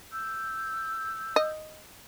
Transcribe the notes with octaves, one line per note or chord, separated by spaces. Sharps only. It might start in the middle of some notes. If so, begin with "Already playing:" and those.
E6 G6
D#5